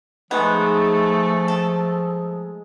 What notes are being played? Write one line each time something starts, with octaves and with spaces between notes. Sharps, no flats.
F3 G#3 A3 B3 D#4 G#4
A4